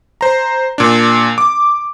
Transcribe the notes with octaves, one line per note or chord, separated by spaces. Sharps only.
C5 A#5
A#2 D4
D6